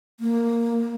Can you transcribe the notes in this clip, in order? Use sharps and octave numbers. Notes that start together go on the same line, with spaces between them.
A#3